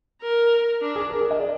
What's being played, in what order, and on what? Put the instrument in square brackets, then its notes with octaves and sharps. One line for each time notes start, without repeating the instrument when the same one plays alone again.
[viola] A#4
D4
[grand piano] G#4
A#4
G#4
D#5
D5